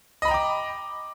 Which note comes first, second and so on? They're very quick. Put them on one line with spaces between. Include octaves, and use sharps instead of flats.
D#5 B5 A#5 G5 D6